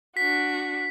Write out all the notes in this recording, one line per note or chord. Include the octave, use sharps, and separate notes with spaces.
D4 F#4 B6